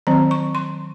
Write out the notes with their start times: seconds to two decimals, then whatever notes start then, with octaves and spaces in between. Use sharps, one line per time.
0.07 D#3 F#3 C4 A#5
0.31 C#6
0.55 C6